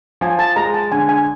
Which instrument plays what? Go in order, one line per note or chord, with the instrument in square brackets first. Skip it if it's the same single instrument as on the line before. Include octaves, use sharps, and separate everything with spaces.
[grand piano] F3 [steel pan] G#5
[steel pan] A5
[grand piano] G#3 [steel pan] A#5
[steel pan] A5
[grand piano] D3 [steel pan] G#5
[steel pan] G#5